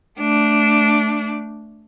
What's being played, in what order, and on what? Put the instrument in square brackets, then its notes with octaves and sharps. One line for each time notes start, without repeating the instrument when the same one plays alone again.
[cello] A3 D4